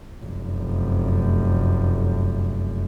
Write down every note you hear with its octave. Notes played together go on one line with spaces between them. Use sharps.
F1 F#2